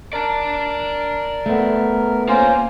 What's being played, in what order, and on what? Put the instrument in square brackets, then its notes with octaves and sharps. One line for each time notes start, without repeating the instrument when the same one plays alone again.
[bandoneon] A#4 [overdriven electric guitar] D5 A5
[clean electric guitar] A3 B3
[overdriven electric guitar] A#3 [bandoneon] C#4 F4 C5